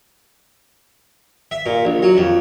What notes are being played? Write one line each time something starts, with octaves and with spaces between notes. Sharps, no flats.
E5
A#2
A#1
F#3
F2